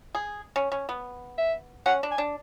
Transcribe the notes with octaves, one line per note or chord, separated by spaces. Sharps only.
G#4
C#4
C#4
B3
E5
C#4 F#5
D4
G#5
D4